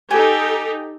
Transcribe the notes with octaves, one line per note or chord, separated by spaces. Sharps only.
D#4 G4 A4 G#5